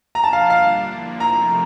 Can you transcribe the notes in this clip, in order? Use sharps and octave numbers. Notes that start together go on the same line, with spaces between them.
F3 A#3 D4 F4 A#5
A5
F5
D3 G3 D4 F5
F3 A#3 E4
C3 F3 A3 C4 A#5